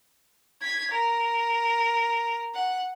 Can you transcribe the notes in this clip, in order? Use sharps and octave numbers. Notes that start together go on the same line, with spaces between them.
G#6 B6
A#4
F#5